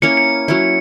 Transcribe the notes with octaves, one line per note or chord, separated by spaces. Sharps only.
A#3 C#4 E4 A#4 C#7
C#7
F#3 C#4 E4